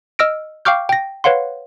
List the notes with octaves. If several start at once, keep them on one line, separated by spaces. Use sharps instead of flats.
D#5 E6 F6 A#6 D7
F5 G5 C#6 D6 F6 G6
G5 A#6
B4 C#5 F5 F#5 C6